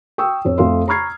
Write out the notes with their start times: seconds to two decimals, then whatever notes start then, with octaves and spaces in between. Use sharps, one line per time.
0.18 G5 C#6 D#6 E6
0.45 F2 C#5
0.58 F2 A3 F5 C6
0.88 A#5 B5 C#6 F6 G#6 C7